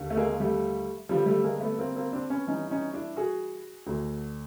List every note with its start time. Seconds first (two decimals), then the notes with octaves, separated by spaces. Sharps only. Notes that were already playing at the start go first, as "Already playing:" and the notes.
Already playing: D#2 D3
0.10 A3
0.17 G#3 A#3
0.40 G3 A3
1.09 G2 D3 F3 G3
1.26 G3 A3
1.44 G#3 A#3
1.61 A3 B3
1.78 A#3 C4
1.96 A#3 C4
2.12 C4 D4
2.30 B3 C#4
2.47 G2 E3 C#4 D#4
2.70 C#4 D#4
2.93 D4 E4
3.17 F#4 G#4
3.87 D2 D3